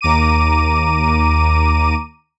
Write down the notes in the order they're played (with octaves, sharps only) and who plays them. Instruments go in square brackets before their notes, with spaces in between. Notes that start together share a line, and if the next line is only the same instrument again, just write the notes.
[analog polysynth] D#2 A#5 D6 D#7